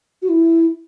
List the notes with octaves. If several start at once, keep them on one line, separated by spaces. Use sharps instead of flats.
F#4
E4